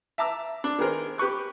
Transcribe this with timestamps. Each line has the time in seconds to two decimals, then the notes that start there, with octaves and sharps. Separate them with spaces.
0.18 E5 A5 A#5 D6 E6
0.64 D4
0.78 D#3 B3 G#4 A#4 C5
1.18 G4 B4 C#6 F#6